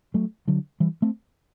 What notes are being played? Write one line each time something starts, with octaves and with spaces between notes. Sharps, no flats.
F#3 A3
D3 F#3
E3 G3
A3 C4